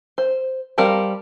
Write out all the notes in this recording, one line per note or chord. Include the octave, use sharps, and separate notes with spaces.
C5
G3 C4 A#4 F5 A5